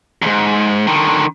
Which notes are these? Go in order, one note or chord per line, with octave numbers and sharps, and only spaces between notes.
D2 G#2
D3 D#3